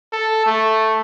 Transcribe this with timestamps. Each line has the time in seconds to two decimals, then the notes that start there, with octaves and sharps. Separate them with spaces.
0.13 A4
0.46 A3